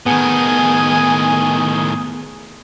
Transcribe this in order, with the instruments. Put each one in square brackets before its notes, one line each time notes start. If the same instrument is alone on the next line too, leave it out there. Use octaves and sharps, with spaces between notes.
[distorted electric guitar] A2 D#3 [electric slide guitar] B3 [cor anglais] G#4 [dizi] G#5